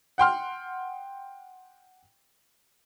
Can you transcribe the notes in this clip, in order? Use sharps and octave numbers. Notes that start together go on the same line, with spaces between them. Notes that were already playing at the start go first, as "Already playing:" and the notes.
F#5 G5 C6 F6